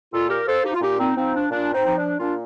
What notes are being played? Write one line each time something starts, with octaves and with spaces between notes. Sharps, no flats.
A#2 F4 A4
G4 A#4
F3 A4 C5
D#4 G4
F4
A#2 D#4 G4
C4 D#4
F3 C4 D#4
D4
A#2 D4
C4 D#4
F3 D#4
D4
A#2 D4 F4